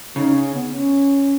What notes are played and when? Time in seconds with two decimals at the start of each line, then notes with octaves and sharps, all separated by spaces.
0.16 C#3 D#4
0.35 C#4
0.54 B3
0.74 C#4